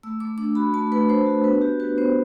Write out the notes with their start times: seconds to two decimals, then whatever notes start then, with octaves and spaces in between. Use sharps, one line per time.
0.03 A3 E6
0.20 A3 D6
0.38 D4 D6
0.55 F#4 B5
0.73 A3 A5
0.92 A3 B4
1.09 D4 C5
1.26 F#4
1.44 B3 B4
1.61 F#4 G4
1.80 F#4 B4
1.97 B3 C5